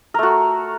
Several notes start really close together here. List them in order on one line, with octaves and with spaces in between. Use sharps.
A#4 A3 F#4